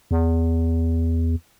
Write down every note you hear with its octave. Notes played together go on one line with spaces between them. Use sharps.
E2